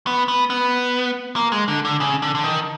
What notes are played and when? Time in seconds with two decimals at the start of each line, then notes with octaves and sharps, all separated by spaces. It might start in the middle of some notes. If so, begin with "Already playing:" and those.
0.07 B3
0.28 B3
0.50 B3
1.36 A#3
1.52 G#3
1.68 D3
1.85 D3
2.00 C#3
2.22 D3
2.35 D3
2.44 D#3